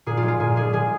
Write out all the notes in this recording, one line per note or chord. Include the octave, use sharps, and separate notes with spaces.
A#2 G#4
F4
G#3
F4
A#2 G#4
G#3 G#4
G#3 G#4